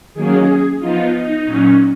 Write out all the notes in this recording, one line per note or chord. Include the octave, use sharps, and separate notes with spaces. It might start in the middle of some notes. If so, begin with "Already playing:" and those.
D#3 F#3 A#3 C#4 G#4
F3 B3 D#4 F4
D#4
A#2 F#3 C#4